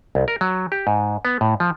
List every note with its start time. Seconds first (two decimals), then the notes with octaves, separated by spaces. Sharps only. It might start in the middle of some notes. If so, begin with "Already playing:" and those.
0.15 C2
0.28 A#4
0.41 F#3
0.72 G4
0.87 G#2
1.25 B3
1.41 A2
1.60 F3